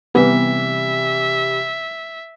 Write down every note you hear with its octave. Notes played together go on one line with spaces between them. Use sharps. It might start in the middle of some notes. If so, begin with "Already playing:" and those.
C3 E3 G3 B3 E5